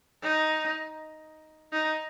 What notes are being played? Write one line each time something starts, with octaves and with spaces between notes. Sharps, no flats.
D#4
D#4